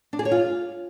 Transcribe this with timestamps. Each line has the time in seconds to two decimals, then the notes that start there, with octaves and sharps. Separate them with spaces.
0.13 D4
0.19 G#4
0.25 C#5
0.32 F4